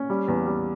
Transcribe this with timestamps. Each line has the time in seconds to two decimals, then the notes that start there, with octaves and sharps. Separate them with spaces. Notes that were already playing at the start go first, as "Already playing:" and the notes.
Already playing: C#4
0.10 G3
0.28 E2
0.46 G3